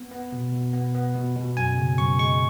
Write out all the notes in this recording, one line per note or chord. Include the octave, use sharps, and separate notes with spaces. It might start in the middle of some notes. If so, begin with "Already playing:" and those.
Already playing: B3
B3
B2
B2
B3
B3
B2
B2
F#2 G#5
C#3
F#2 C#6
G#3 C#6